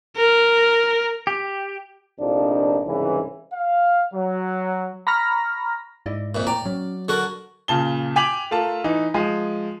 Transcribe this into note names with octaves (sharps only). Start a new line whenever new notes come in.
A#4
G4
A#1 A2 C3 F3 D4 D#4
C2 G#2 C#3 E3
F5
F#3
A#5 B5 C#6 F6 A#6
G#2 E4 D5 D#5
F2 A#2 E5
A2 D5 G5 A#5
F#3 C#4
D3 F#4 A4 A#4
A#2 C#3 A5 G7
G5 G#5 D6 B6 F7 F#7
A3 F4 A#4 A5
E3 D#4
F3 G#3